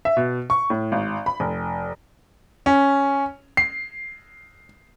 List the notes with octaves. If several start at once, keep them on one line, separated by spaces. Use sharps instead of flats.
E5
B2
C#6
A2
G#1
B5
F1
C#4
C7